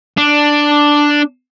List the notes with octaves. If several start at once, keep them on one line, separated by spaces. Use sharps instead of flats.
D4